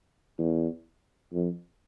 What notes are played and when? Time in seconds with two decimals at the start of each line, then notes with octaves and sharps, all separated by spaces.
0.39 E2
1.33 F2